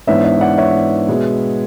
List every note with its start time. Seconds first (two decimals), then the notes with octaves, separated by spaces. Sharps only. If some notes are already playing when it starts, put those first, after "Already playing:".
0.07 G#2 E3 B3 D4 C#5 E5
0.24 C#5 E5
0.41 D5 F#5
0.58 C#5 E5
1.09 B2 G#3 B3